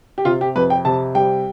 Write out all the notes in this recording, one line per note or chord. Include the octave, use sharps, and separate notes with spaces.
G4
C3 F4
G4
F2 B4
G5
C3 A5
G3 G5